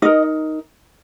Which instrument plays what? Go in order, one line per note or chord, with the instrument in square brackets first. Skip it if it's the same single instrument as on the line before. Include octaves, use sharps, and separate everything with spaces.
[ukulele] D#4 A#4 D#5